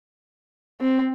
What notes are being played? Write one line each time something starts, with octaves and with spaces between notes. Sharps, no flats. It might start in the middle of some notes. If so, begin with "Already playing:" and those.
C4